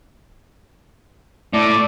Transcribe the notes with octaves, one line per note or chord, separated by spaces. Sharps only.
A2 D5